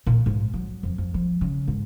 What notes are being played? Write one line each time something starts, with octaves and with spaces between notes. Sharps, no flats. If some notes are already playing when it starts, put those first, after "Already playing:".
A#2
G#2
F#3
F2
F2
F3
C#3
G#2